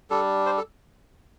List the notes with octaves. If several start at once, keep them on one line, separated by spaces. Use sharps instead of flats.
G3 D4 A4
C5
A4